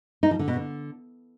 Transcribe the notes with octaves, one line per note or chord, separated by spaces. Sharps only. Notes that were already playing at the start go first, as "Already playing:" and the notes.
D#4
F3
D3
B2
D3